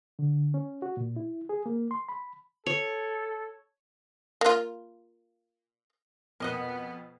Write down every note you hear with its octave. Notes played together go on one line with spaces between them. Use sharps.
D3
C#4
F#4
A#2
E4
G#4
A#3
C6
B5
A4 C#5
A#3 F4
F2 B2 B3 A#4 D#5 F#5